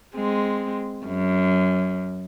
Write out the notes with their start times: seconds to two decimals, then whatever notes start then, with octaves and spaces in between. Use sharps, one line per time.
0.16 G#3 C4
1.06 F#2